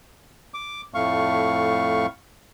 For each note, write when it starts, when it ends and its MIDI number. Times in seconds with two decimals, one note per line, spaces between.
0.54 0.81 86
0.94 2.06 41
0.94 2.06 45
0.94 2.06 57
0.94 2.06 77
0.94 2.06 85